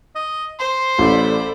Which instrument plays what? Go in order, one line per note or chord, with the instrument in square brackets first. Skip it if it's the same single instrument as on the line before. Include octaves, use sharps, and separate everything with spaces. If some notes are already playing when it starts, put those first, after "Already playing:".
[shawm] D#5
[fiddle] C5 [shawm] C6
[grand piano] A1 [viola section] A4 D5 B5